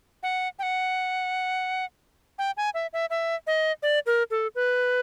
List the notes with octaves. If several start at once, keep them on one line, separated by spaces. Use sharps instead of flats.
F#5
G5
F#5
G5
G#5
E5
E5
E5
D#5
D5
A#4
A4
B4